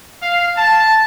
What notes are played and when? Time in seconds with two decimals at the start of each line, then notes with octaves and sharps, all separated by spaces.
0.22 F5
0.57 A5